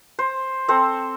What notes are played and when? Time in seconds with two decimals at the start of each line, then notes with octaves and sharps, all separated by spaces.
0.19 C5
0.68 C4 A4 C5